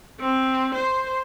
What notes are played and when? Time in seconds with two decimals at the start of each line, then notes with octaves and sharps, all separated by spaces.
0.20 C4
0.75 C5